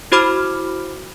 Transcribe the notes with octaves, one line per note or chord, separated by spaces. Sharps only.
E4 F#4 C5 B5 D6 F6